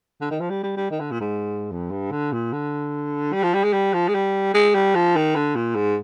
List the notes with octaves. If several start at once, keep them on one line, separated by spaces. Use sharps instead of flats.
D3
D#3
F3
G3
G3
G3
D#3
D3
A#2
G#2
F2
G2
D3
A#2
D3
G3
F3
G3
G#3
G3
F3
G#3
G3
G#3
G3
F3
D#3
D3
A#2
G#2